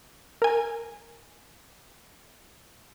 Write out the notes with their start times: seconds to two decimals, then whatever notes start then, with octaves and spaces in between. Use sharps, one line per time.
0.42 A#4 G#5